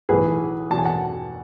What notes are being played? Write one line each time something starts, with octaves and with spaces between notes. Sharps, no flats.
B1 A2 E3 G#4 B4
E2 B2 F#3 A5
G#5
F#5 A5